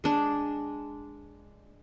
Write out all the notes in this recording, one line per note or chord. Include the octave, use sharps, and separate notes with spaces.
G#3 D4